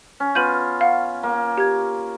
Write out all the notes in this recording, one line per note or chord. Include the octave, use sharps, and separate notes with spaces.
C#4
B3 F4 G6 D#7 F#7
F5 F#5
A#3
G4 G#6